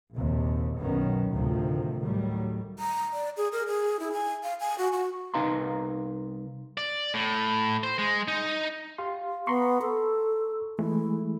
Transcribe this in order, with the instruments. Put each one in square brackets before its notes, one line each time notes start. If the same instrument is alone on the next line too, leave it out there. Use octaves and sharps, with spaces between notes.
[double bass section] A#1 D#2 C3
B1 F#2 D#3 F#3 B3 C#4
A1 D2 C3 D#3 F3
A2 D#3 F#3 G3
[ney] A#5
D5
G#4
A#4
G#4
E4
G#5
F5
G#5
F#4
F#4
[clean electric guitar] C2 D#4 B4 F5 A#5 C6
[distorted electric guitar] D5
A2
C5
G#3
D#4
[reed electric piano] G4 F5 C6
[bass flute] B3 [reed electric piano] A#5 C6 C#6
[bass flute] A4
[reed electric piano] E3 G#3 A3 [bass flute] E4